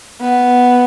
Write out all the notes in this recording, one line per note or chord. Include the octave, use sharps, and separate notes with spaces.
B3